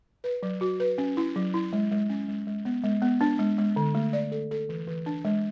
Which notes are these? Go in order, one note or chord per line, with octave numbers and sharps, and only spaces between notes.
B4
F#3
F#4
B4
C#4
E4
F#3
E4
G#3
G#3
C#4
G#3
G#3
B3
G#3
B3
D4
G#3
G#3
D3
A3
D5
A4
A4
E3
E3
D4
G#3